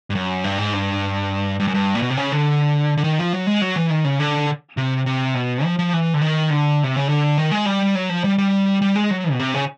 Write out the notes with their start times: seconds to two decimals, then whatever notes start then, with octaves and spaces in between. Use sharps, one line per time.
0.10 G2
0.15 F#2
0.44 G2
0.58 G#2
0.73 G2
1.60 G2
1.67 F#2
1.74 G2
1.95 A#2
2.02 B2
2.10 C3
2.17 C#3
2.32 D3
2.97 D3
3.04 D#3
3.19 F3
3.33 F#3
3.47 G#3
3.61 F#3
3.76 E3
3.90 D#3
4.05 C#3
4.20 D3
4.77 C3
5.06 C3
5.34 B2
5.64 F3
5.79 F3
5.93 E3
6.14 D3
6.22 D#3
6.50 D3
6.84 C3
6.96 C#3
7.09 D3
7.38 D#3
7.51 G#3
7.66 G3
7.95 F#3
8.09 F3
8.24 G3
8.38 G3
8.82 G3
8.95 G#3
9.11 F#3
9.32 B2
9.39 C3
9.54 C#3